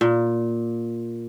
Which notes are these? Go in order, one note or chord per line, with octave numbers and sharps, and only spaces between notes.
A#2